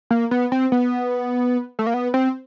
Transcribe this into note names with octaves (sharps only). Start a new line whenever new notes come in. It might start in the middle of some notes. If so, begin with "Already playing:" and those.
A#3
B3
C4
B3
A3
A#3
B3
C4